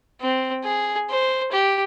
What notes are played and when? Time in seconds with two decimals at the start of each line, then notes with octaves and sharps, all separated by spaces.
0.21 C4
0.64 G#4
1.10 C5
1.52 G4